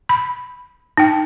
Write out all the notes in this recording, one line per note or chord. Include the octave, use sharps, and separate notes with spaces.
B5
D#4 G5